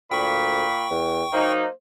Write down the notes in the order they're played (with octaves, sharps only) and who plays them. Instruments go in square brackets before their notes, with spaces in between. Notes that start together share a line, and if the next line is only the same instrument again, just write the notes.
[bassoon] D2 [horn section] A#2 B5 [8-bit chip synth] G5 C#6
[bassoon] E2
[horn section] F#3 A#3 D#4 [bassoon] C5